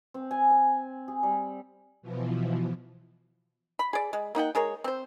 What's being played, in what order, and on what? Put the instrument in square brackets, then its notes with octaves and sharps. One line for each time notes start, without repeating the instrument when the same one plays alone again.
[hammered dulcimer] C4
G#5
G#5
G#4
G3
[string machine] B2 E3 F3
[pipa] B5
G#4 D5
G#3
A#3 D#4 F#5 G5
G#3 G#4 A#4 C#5
C4 C5